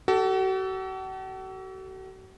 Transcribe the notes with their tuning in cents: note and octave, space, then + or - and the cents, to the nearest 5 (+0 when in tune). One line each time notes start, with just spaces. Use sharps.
F#4 +40 A4 +0